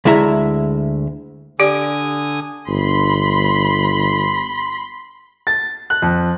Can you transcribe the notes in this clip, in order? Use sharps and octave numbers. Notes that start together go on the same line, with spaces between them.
D2 G#3 E4 E5 A#5
D3 G4 D5 G#5 D#6
G1 B5 C6
A6
F#6
F2